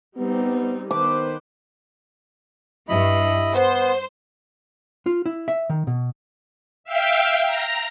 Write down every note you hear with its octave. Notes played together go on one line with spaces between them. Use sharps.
G3 B3 C4 D#4
D#3 B3 B4 C5 D6
G2 E4 D#5 B5
B3 C5
F4
E4
E5
D#3
B2
E5 F5 G5
A#5